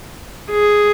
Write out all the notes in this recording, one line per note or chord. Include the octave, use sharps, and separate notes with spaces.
G#4